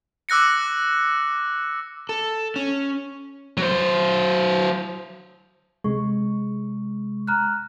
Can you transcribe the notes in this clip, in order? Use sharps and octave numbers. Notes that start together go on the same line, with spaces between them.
D6 E6 F#6 A#6 C#7
A4
C#4
F#3 C5
C3 G#3 C#6
A#5 F6 F#6